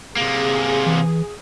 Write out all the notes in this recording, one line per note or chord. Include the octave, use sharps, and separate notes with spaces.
C3 A#3 G#4
E3